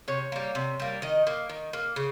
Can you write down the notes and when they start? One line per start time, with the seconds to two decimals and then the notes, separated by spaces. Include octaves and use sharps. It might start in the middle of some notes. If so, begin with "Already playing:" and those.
0.08 C3 C#5
0.32 G3 A#3
0.55 C3
0.80 G3 A#3
1.02 D#3 D#5
1.27 A#3
1.50 D#3
1.73 A#3
1.96 C#3